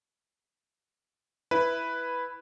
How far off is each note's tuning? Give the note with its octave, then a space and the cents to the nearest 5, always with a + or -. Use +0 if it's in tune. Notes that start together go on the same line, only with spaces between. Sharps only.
E4 +0 B4 +0